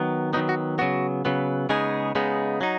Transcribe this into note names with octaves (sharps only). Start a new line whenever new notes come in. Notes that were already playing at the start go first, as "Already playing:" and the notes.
Already playing: D#3 F#3 B3
D#3 F#3 B3 D#4
F#4
C#3 F#3 B3 F#4
C#3 F#3 B3
C#3 G#3 B3 D#4 G#4
C#3 G#3 B3 D#4
F#3 D#4